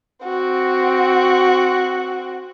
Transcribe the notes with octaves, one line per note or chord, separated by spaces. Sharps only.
C4 F#4